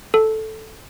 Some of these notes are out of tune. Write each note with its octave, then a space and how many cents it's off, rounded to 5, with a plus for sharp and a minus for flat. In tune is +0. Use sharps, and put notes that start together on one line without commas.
A4 -5